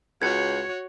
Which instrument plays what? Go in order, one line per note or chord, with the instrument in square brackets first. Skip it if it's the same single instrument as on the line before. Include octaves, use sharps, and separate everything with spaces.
[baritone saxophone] C#2 [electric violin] F#4 C#5 [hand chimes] G#6 C#7